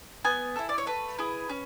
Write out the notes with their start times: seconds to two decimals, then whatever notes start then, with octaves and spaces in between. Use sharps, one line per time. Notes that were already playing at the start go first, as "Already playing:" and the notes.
0.25 B3 G#5
0.56 E4 A4
0.69 D5
0.78 C#5
0.87 A3 B4
1.19 E4 G#4
1.49 C#4